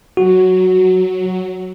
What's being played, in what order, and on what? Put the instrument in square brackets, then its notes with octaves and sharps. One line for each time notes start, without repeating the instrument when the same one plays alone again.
[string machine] F#3 [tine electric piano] F#4